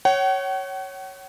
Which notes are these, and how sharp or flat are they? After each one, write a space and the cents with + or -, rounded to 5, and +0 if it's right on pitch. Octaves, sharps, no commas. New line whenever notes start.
C#5 +0 F#5 +45